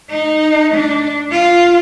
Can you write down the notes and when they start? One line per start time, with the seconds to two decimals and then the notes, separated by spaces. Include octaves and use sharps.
0.10 D#4
0.75 D4
1.32 F4